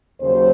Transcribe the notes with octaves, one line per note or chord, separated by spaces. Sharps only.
D#2 C#3 F#3 C5